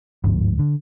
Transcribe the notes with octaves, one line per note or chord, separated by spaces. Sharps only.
G1 D2 G#2 F3
D3